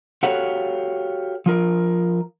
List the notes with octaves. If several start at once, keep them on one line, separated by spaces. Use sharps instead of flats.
F#4 G4 A4 C#5 F5 F#5
F3 F4 A#4